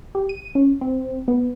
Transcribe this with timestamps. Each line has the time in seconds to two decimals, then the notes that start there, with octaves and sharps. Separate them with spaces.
0.15 G4
0.29 D#7
0.55 C#4
0.81 C4
1.28 B3